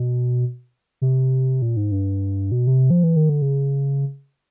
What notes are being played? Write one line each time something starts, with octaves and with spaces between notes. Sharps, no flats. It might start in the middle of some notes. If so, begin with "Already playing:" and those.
Already playing: B2
C3
A#2
G#2
G2
B2
C3
F3
E3
D#3
D3
C#3